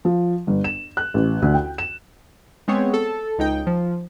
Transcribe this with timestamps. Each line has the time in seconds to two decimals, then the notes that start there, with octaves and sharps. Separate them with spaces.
0.05 F3
0.47 G1
0.64 E7
0.97 F#6
1.14 A1
1.42 D2
1.54 G5
1.78 E7
2.68 G#3 B3 C4 C#5
2.94 A4
3.39 C#2 D#4 G5
3.67 F3